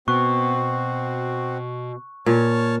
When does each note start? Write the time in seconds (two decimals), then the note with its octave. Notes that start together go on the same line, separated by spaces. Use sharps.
0.08 B2 C4 F#4 C#6 F#6
2.26 A#2 C#5 A5 F6